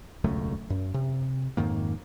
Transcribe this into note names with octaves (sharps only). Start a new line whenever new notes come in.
E1 C#2 F#2 A3
F#2
C3
F2 G#2 D#3 A#3